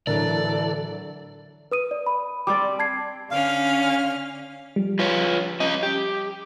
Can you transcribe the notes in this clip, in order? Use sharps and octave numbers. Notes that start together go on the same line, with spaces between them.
A2 D3 E3 F#3 D4 A4 A#4 D5
B4 D#6 D#7
D5
B5
G3 C4 D5 D6
A5 G#6 C7
D3 C#4 F5 F6
F3 G3
F4 B4 C#5
C#4 D#5
G4